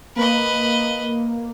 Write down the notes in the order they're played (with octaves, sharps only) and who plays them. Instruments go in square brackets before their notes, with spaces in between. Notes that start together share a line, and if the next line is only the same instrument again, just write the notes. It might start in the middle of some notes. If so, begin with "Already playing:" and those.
[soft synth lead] A#3 [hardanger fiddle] B4 D#5